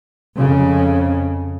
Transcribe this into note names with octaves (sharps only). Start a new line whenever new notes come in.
F2 C#3